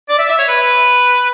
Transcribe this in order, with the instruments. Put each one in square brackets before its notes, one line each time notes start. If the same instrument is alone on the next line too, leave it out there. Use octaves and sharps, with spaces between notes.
[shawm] D5
E5
E5
C#5
B4